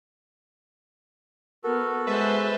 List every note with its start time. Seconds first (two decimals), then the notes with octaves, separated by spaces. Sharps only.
1.64 B3 F#4 A4 A#4
2.07 G#3 B4 C5 E5 A5